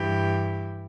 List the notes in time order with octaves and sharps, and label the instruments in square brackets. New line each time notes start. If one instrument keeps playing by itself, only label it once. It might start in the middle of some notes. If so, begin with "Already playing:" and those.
Already playing: [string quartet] G2 E3 G4